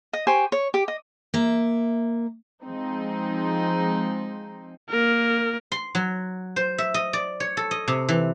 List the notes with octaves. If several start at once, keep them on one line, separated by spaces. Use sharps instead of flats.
D#5
G4 C5 G#5 C#6
C#5
G4
D#5
A#3 E5
F3 G#3 C4 D#4
A#3 A#4
C6
F#3
C5
E5
D#5
D5
C#5
A4
D#5
C3
E3